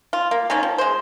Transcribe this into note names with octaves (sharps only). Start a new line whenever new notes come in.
F4
A#3
D#3 A#3 C4 C#4
F3
G#3 C5